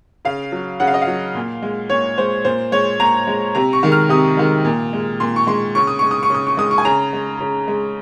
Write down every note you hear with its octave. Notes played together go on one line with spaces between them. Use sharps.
C#3 F5
F#3
C#3 F#5
F5
D#5
F5
F#3
A#2
G#3
A#2 C#5
G#3 C5
A#2 C5
G#3 C#5
A#2 A#5
G#3
C3 A#5
C#6
D#3 G#3
F6
C3 D#6
D#3 G#3
A#2
G#3
A#2 C6
C#6
G#3 C6
C#3 C#6
D#6
G#3 C#6
D#6
C#6
C#3 D#6
C#6
G#3 D#6
C#6
G#5
C#3 A#5
G#3
C#3
G#3